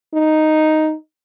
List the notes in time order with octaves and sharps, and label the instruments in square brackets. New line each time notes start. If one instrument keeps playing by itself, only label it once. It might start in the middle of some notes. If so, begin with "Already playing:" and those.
[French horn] D#4